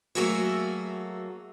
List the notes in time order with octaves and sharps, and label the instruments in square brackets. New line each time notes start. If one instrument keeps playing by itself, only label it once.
[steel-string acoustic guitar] F#3 A3 A#3 F#4 G#4 E5